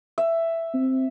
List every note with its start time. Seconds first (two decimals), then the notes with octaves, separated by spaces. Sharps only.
0.18 E5
0.74 C4